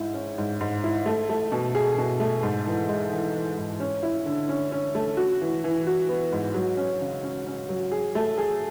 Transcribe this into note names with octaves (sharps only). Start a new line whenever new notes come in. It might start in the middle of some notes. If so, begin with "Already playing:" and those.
Already playing: G#2 E4
C#4
G#2
G#2
E4
A3
A3
B2
G#4
B2
A3
G#2
E3
G#3
E3
E3
G#2
C#4
E4
D3
C#4
C#4
A3
F#4
E3
E3
F#4
B3
G#2
F#3
C#4
C#3
C#4
C#4
F#3
G#4
A3
G#4